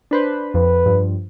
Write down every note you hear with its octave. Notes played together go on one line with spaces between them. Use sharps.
D4 B4 C5
F2 B4
G2 F3